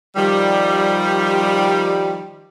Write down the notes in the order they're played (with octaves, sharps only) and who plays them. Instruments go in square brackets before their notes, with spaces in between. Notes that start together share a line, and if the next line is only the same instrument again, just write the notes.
[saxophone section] D#3 F3 G3